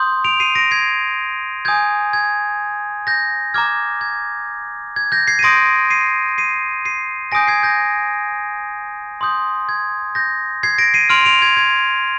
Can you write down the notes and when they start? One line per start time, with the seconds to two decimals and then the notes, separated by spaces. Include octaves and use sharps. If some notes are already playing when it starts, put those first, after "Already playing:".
Already playing: C6 D#6 G6
0.25 D7 F7
0.40 C7 D#7
0.55 A#6 D7
0.71 G#6 C7
1.65 G#5 D#6 G6 G#6
2.13 G#6
3.07 G6 A#6
3.54 A#5 D6 F6 G#6
4.01 G#6
4.96 G#6
5.12 G6 A#6
5.27 G#6 C7
5.39 D#7
5.43 C6 D#6 G6 A#6 D7
5.90 C7 D#7
6.38 C7 D#7
6.85 C7 D#7
7.32 G#5 D#6 G6 A#6 D7
7.47 G#6 C7
7.63 G6 A#6
9.21 C6 D#6 G6
9.69 G#6
10.15 G6 A#6
10.63 G#6 C7
10.78 A#6 D7
10.94 C7 D#7
11.10 C6 F6 D7 F7
11.25 D7 F7
11.42 G#6
11.57 G#6